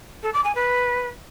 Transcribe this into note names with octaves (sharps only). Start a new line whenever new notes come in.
A4
D6
G#5
B4